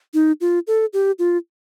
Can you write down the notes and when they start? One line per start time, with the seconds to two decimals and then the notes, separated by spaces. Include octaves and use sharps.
0.14 D#4
0.41 F4
0.67 A4
0.93 G4
1.19 F4